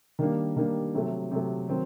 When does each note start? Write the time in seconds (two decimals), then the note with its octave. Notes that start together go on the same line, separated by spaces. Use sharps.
0.19 D#3 G3 A#3 D4
0.56 D#3 G3 A#3 D4
0.95 C3 F#3 A3
1.31 C3 F#3 A3
1.69 D#3 F#3 C4